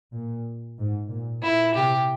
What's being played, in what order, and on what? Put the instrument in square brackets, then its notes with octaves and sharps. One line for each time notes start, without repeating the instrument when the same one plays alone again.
[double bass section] A#2
G#2
A#2
[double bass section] A#2 [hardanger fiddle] E4
[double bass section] C3 [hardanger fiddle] G4